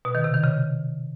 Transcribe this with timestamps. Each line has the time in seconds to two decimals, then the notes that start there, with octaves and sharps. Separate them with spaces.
0.05 B2
0.15 D#3
0.24 C3
0.34 D#3
0.44 C#3